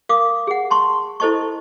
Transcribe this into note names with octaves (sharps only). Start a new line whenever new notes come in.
A#4 F5 D6 D#6
G#4 F#5
A5 C6 C#6
E4 A4 C5 D#5 A5 C#6